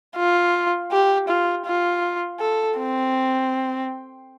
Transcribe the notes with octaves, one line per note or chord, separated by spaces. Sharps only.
F4
G4
F4
F4
A4
C4